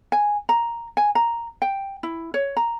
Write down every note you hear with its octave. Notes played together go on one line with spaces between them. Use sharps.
G#5
A#5
G#5
A#5
G5
E4
C#5
A#5